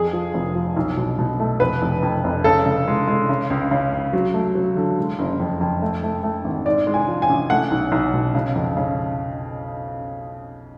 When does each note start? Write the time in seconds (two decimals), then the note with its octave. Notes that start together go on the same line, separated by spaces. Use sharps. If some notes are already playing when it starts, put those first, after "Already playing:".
Already playing: F2 G#4
0.13 F3
0.34 F1
0.55 F3
0.77 B1
0.97 B2
1.19 B2
1.40 A3
1.60 F1 B4
1.82 F1
2.03 F2
2.24 F1
2.44 C#3 A4
2.66 C#3
2.87 G#3
3.07 G#3
3.29 C#3
3.50 C#2
3.71 C#3
3.93 C#2
4.13 F#3
4.34 A3
4.55 F#3
4.77 D3
4.98 G#3
5.19 F#1
5.40 F2
5.61 F2
5.82 A3
6.03 A3
6.23 A3
6.45 G#1
6.66 G#2 D5
6.87 G#3
6.94 G#5
7.08 F3
7.22 G#5
7.29 A1
7.50 A3 F#5
7.71 B1
7.92 B1
8.13 B2
8.35 C#3
8.56 F2
8.77 C#3